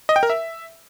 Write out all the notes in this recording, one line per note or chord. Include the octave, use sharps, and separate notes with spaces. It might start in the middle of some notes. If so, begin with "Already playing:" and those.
D#5
G5
A#4
E5